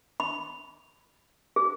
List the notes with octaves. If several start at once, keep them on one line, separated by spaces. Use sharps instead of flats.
B5
G#4